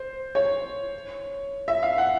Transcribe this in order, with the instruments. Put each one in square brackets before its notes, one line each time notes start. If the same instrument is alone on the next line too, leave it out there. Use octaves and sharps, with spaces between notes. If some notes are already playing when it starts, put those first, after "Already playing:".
Already playing: [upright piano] C5
C#5
E5
F5
F#5